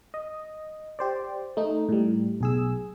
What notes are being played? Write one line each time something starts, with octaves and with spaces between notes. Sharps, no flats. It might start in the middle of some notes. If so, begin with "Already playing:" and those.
D#5
G4 C5 D5
A3 D#4
A2 G3
B1 G#4 E6